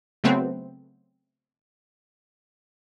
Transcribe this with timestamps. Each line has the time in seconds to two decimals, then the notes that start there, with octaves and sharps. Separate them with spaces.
0.24 C#3 F#3 A3 B3 C4